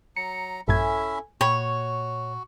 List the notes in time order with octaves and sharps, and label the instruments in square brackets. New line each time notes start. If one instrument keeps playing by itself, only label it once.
[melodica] F#3 A#5 [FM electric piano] C#7
[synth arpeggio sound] A#1 G2 G#6 [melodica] C#4 E4 E5 [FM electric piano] A4 G#5
[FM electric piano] A#2 [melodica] F#4 [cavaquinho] C#5 [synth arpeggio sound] G5 B5